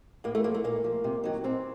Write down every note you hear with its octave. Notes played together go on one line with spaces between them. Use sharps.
A2 A#3
A3
F3 A#3
A3
A#2 A#3
F3
C3
D#3 F#3
A#2 C4